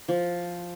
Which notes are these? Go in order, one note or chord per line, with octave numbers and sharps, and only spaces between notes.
F3